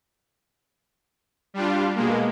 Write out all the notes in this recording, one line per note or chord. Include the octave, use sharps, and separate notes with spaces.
G3 D4 F4
B2 G#3 A#3